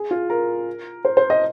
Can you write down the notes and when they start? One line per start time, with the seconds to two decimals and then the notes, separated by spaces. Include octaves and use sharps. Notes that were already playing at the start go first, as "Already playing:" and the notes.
Already playing: G#4
0.11 F4
0.30 A#4
1.05 C5
1.17 C5
1.30 D#5